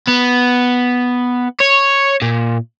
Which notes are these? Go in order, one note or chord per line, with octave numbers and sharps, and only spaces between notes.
B3
C#5
A#2